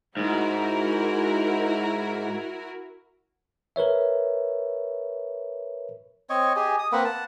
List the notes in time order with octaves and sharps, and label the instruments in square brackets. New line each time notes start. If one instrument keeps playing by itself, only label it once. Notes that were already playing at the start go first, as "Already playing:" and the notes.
[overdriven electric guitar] G#2 [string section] E4 F#4 A#4
[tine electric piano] A#4 B4 C#5 E5
[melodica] C4 C#5 D#5 C#6
G4 G#4 D#5 G#5
D#6
A#3 C4 B4 F#5
F#5 A5